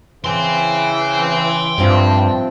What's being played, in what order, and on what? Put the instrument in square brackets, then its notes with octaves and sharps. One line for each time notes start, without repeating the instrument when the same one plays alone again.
[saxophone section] C#3 E3 [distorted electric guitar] G5 C6
[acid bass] G2 [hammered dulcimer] F3 C4 E5